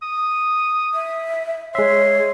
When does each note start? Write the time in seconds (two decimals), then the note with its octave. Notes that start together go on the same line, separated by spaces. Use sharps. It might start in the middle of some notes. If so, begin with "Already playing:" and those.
0.03 D#6
0.94 E5
1.75 G#3 C#5 E5 C6